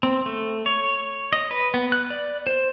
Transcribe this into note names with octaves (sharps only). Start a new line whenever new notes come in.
C4
A3
C#5
D#5
B4
B3
F#6
D5
C5